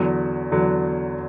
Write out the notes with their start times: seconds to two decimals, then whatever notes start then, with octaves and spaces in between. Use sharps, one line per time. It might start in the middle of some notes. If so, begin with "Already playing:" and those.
Already playing: E2 D3 F#3
0.52 E2 D3 F#3